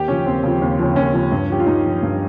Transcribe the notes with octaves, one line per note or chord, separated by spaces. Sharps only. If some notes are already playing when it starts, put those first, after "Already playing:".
Already playing: D#2 G4
C#3 F3 C#4
D#2 C4
C#3 F3
D#2
C#3 F3
D#2 C#4
C#3 F3
G2
F3 G4
F4
G2 D#4
F3
G2